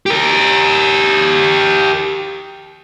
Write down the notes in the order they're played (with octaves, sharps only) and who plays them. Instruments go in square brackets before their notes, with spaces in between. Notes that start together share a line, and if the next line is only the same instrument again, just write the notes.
[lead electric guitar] G4 A#4